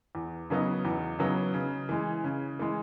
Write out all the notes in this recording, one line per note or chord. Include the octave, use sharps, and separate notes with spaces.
E2
C#3 F#3 B3 D#4
E2
C#3 F#3 B3 D#4
C#3
E3 G#3
C#3
E3 G#3